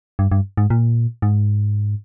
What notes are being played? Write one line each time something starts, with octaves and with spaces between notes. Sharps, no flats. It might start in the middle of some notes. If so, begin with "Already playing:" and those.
G2
G2
G#2
A#2
G#2